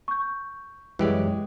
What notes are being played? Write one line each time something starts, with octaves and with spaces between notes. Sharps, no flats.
C#6 G6
F#2 E3 F#3 G#3 G4 D5